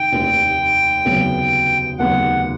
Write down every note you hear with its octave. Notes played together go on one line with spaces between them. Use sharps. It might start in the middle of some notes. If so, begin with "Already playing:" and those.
Already playing: F1 D#3 G5
F1 D#2 D#3
F1 D#2 C#3 F#3 B3
F1 D#2 C#3 F#3 B3 F#5